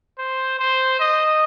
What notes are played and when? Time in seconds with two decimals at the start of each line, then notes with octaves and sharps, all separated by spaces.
0.18 C5
0.59 C5
1.00 D#5